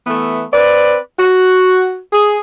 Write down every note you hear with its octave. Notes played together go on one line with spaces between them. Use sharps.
E3 A3 B3
C4 B4 D5
F#4
G#4